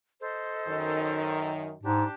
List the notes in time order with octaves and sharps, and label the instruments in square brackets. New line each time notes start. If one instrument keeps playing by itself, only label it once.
[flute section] A4 C5 D#5
[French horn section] F#2 D#3
[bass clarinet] G#2 [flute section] D4 G4 A5